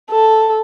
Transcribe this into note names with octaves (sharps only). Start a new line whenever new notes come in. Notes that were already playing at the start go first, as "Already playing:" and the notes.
A4